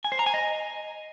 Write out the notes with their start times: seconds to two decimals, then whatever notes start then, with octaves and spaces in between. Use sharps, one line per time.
0.05 G#5
0.12 C5
0.19 A#5
0.26 G#5
0.34 D#5